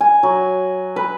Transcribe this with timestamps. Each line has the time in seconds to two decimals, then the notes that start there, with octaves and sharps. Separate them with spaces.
0.01 G#5
0.23 F#3
0.96 B4